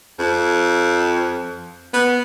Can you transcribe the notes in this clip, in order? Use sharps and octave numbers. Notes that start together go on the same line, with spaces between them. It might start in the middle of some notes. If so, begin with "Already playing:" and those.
F2
B3